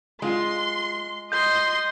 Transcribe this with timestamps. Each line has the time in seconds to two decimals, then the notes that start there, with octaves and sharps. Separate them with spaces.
0.22 G#3 F4 C6
1.32 D#5 C6 G6